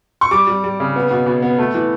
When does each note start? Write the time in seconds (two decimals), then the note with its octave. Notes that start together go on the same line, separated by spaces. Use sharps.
0.21 C#6
0.31 G3 D6
0.47 G3
0.64 G3
0.80 C#3
0.96 B3
1.11 B2
1.26 B2
1.42 B3
1.58 A3
1.74 E3